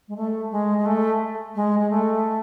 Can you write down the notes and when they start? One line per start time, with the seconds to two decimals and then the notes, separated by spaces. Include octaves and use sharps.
0.08 G#3
0.16 A3
0.51 G#3
0.78 G#3
0.86 A3
1.55 G#3
1.79 G#3
1.90 A3